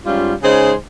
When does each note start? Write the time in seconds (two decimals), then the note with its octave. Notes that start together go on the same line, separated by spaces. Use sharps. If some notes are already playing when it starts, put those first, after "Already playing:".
0.03 G#2 G3 C#4 F4
0.42 C#3 G#3 D#4 G#4 C5